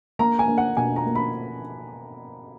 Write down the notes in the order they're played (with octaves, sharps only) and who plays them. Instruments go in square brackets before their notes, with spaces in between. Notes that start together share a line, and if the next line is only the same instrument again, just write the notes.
[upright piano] A#3 A#5
G#5
A#3
F#5
B2 G#5
A#5
A#3
B5